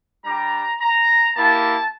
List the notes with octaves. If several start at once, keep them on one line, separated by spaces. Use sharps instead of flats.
G3 D4 G4 A#5
A#5
A#3 E4 G4 A5